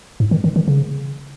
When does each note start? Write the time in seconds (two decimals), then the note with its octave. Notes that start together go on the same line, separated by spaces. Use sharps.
0.20 G#2
0.31 D#3
0.44 D#3
0.56 D#3
0.68 C#3